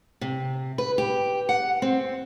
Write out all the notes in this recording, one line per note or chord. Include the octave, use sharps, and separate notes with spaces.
C3
B4
G4
F#5
C4